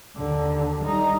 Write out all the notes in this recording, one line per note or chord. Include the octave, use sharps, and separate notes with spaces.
D#2 D3
G3 D#4